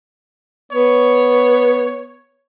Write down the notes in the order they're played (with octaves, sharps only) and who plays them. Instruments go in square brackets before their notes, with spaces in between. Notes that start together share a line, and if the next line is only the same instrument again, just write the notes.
[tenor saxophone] B3 [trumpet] C#5